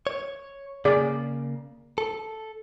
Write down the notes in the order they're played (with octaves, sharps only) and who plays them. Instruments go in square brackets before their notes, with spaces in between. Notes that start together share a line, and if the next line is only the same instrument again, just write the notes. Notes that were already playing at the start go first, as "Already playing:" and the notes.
[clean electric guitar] C#5
[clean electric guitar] C#3 A#3 [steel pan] G#4 D5
[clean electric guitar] A4